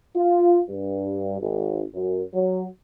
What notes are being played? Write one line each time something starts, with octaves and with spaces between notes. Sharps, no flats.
F4
G2
G#1
F#2
F#3